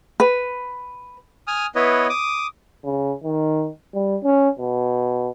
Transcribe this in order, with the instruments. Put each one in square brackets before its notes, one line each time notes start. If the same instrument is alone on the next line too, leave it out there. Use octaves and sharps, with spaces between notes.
[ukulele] B4
[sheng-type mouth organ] G#5 D#6 F6
B3 E4 B4 C#5 D#5
D6 D#6
[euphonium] C#3
D#3
G3
C#4
B2